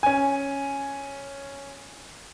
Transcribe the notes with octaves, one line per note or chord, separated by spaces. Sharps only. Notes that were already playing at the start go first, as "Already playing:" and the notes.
C#4 G#5